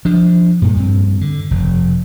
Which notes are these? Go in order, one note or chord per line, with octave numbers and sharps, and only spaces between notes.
F3 D4
G2 A#2
G2 C4
D3
F1